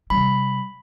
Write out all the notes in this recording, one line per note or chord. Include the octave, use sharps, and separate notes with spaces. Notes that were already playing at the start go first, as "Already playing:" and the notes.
C3 G3 B5